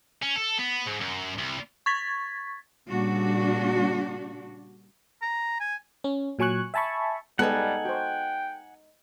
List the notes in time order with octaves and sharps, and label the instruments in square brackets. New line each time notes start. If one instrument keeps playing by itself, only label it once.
[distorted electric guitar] C#4
A4
B3
G#2
F#2
C2
[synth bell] C#6 G#6 A6 B6
[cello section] A#2 C#3 G3 D4 F#4
[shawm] A#5
G#5
[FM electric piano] C#4
A#2 F#3 G#5 C#6 F#6
E5 G#5 A5 B5 C#6
[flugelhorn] G3 [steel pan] G#3 B3 [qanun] D#4 A4 [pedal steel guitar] F#5 G#5
[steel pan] F#4 C5 [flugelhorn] G5